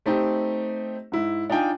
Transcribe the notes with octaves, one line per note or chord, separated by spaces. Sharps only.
A3 C4 D#4 G4
G#2 E4
D4 D#4 F4 G5 G#5